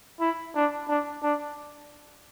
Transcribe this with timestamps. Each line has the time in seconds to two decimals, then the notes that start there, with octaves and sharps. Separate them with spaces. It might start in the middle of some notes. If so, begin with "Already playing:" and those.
0.20 E4
0.55 D4
0.88 D4
1.23 D4